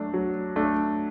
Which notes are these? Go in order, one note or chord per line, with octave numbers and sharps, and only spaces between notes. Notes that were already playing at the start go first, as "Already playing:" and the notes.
Already playing: F#3 A3 D4
F#3
A3 D4